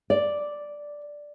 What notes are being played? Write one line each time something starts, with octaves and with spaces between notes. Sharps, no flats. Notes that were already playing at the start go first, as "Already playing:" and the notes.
D5